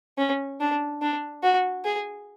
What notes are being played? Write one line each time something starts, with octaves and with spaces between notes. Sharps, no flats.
C#4
D4
D4
F#4
G#4